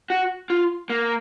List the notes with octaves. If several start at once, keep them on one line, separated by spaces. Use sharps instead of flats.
F#4
F4
A#3